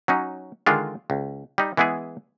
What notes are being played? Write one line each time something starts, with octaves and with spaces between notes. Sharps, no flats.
F#3 C#4 D#4
D3 D#3 G#3 D4 F4
C#2
G3 D#4
E3 G#3 B3 E4 G#4